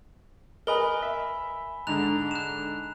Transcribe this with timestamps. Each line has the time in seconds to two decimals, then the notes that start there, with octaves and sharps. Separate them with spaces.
0.67 A#4 B4 D#5 G#5 B5 G7
1.02 E5
1.87 G#2 D3 A#5 F#6 F7
2.31 F#6 E7